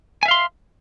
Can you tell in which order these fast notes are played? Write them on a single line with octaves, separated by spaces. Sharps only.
G#5 E5 F5 C6